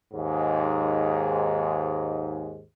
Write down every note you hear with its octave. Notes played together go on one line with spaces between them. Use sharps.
D#2 G#2